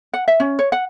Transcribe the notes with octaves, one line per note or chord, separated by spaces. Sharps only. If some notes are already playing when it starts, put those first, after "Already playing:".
F#5
E5
C#4
C#5
F#5